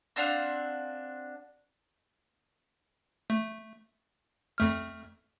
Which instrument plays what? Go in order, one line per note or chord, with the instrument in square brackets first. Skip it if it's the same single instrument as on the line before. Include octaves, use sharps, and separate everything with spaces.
[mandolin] C4 D4 F#4 F5
[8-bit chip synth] A3
F2 A3 F6